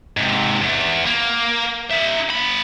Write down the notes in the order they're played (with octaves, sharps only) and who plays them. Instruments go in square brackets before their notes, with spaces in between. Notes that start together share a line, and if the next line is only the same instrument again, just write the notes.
[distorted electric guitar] G#2 C3
E2
A#3
D#4 E5
A#3 B5